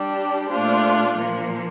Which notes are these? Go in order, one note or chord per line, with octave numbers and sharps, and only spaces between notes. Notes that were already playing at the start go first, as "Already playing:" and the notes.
Already playing: G3 D4 G4
A#2 A3 D4 F4 C5
A#2 F3 A#3